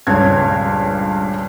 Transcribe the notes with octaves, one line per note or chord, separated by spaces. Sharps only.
D#1 C#2 G2 C#5 G#6